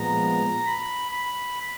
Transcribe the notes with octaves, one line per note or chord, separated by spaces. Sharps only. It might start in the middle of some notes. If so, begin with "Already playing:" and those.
Already playing: A#2 F3 G#3 B3 A#5
B5
B5